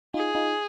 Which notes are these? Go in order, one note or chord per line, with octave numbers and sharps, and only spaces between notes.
D#4 F4 G#4
D#4 F4